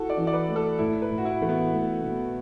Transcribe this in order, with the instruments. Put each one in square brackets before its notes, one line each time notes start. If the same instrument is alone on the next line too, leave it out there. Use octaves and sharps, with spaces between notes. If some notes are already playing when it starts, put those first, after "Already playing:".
Already playing: [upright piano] E4 [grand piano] F#4 A4
[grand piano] D5
[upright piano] E3
[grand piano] D5
B4
[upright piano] A3
[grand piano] A4
[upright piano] A2 [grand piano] E4
[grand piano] B4
[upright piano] A2
[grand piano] F#4
E4
[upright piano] E3 [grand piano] A3
[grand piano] B3
[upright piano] A3
B2